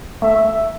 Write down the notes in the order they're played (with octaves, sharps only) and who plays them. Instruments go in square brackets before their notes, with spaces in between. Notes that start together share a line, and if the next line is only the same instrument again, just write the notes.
[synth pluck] A3 [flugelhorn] E5